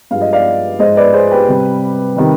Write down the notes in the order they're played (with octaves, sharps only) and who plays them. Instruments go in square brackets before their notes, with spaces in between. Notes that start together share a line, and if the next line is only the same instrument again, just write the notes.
[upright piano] G2 F3 G#3 F5
D#5
D5 F5
G#2 F3 G#3 C5 D#5
B4 D5
G#4 C5
G4 B4
C3 G3
C3 D#3 G3